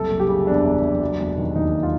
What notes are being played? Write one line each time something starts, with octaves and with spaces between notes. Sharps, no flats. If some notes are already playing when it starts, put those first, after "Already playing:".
Already playing: F#1 C2 A4
F#1
G4
C#3
E2 D4
F#1
F#1
F#3
E1
D#3
D#2 D#4
F#3
F4